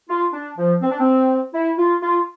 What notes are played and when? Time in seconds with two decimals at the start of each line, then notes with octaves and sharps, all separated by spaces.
0.09 F4
0.33 D4
0.57 F3
0.81 C4
0.91 D4
0.99 C4
1.54 E4
1.78 F4
2.02 F4